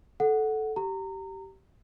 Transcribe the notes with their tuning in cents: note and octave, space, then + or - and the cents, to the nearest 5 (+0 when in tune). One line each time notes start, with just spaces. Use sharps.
A4 -10 F#5 +0
G4 -20 A#5 -25